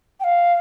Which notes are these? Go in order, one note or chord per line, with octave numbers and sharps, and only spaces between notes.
G5
F5